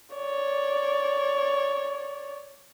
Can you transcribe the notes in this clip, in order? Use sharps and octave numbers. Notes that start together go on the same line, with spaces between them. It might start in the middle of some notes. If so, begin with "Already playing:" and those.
C#5 D5